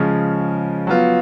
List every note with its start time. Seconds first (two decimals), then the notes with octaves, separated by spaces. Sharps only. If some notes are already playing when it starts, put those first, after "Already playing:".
Already playing: C#3 F3 G#3 C#4
0.87 F#3 B3 F4